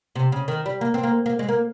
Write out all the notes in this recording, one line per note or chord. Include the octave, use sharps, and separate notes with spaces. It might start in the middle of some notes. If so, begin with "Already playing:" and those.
C3
C#3
D#3
G3
A#3
C4
A#3
A#3
G#3
A#3